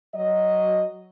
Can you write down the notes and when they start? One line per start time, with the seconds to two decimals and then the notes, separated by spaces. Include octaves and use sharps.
0.14 F#3 D#5